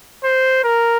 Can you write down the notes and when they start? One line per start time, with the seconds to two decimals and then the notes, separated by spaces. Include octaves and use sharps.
0.24 C5
0.65 A#4